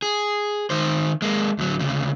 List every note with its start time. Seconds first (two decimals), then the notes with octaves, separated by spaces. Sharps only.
0.02 G#4
0.70 D#3 C5
1.22 G#3 A#3
1.59 D2 F#3
1.79 D2 C#3